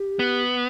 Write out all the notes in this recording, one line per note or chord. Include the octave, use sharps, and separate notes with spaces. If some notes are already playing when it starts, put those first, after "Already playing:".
Already playing: G4
B3